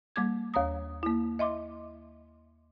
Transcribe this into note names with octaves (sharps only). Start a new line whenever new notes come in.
G3 A#3 D6 G#6
D#2 C#5 A#5 D#6
A#3 E4
D#5 E5 C6 D6